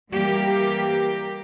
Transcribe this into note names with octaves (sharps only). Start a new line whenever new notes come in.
E3 G3 A#3 G4 A#4